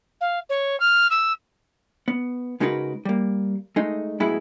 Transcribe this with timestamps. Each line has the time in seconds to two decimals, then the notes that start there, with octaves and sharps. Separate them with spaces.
0.20 F5
0.49 C#5
0.79 F6
1.10 E6
2.08 B3
2.60 C#3 G#3 D#4 F#4 A#4 B4
3.05 G3 A#3
3.76 G#3 A3 D#4
4.20 F#2 A2 G#3 B3 E4 B5